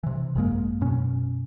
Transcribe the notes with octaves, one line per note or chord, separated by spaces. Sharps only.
C3 E3
G#1 F#2 G#3 A#3
F#2 B2 C#4